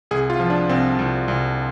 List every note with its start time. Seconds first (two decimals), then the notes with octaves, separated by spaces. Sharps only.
0.11 C2 G#4
0.30 F4
0.40 F3
0.50 D4
0.69 C2 C4
0.99 C2
1.28 C2